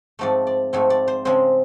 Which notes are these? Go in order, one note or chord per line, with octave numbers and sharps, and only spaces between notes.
G#2 F3 A3 C4 D5
D5
G#2 F3 A3 C4 C#5
D5
C5
C#3 F3 G#3 C4 C5